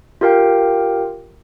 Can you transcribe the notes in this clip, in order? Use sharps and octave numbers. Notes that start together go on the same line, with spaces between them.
F4 G4 A#4 F5 G5